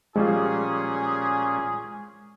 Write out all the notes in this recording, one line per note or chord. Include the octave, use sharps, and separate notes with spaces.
A#2 F3 G3 G#3 C#4 F4 G#4